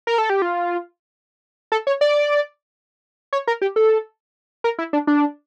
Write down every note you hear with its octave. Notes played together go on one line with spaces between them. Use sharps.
A#4
A4
G4
F4
A4
C#5
D5
C#5
A#4
G4
A4
A#4
E4
D4
D4